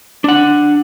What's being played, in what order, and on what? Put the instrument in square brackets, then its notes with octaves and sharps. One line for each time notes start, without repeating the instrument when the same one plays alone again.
[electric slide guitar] D4 F#5